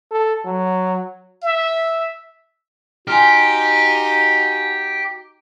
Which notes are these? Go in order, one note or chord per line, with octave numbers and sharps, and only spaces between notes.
A4
F#3
E5
D#4 F#4 G4 G#5 C6 F6